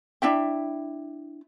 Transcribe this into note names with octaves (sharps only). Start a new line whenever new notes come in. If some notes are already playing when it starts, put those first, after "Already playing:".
D4 E4 E5 G5